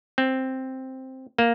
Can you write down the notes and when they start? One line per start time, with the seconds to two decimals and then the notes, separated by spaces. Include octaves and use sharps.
0.18 C4
1.38 A#3